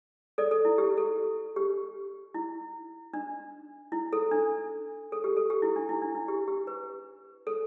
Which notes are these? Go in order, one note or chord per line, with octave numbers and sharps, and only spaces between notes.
A4 D5
A4
E4
G4
A4
G4
E4
D4
E4
A4
D4
A4
G4
A4
G4
E4
D4
E4
D4
E4
G4
G4
B4
A4